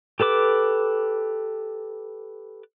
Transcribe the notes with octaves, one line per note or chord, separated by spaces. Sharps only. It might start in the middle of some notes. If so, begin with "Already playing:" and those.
G4 A4 B4 D6